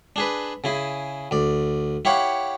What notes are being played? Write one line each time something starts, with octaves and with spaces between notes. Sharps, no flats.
D4 G#4 B4
C#3 E4 G#4
D2 D5
E4 G4 C#5 F5 F#5